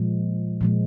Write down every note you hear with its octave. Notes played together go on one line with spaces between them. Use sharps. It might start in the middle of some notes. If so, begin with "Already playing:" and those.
Already playing: A#2 F3 G#3
A#2 F3 G#3